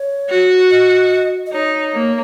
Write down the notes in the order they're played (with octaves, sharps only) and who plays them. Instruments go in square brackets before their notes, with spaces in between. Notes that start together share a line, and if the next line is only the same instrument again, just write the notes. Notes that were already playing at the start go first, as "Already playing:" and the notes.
Already playing: [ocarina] C#5
[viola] F#4
[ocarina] D#5
D#5
[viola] D#4 [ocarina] C#5
[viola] A#3